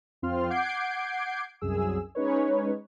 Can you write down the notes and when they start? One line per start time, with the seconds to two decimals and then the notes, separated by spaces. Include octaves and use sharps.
0.22 F2 C4 F4 C6 F6
0.50 F#5 D6 G6 G#6 C7 D7
1.61 C2 F#2 G#4 E6
2.15 G#3 C#4 D#4 B4 C#5